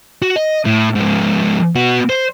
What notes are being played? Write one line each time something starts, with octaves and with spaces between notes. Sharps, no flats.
F#4
D#5
A2
G#2 F3
B3 F#4
C5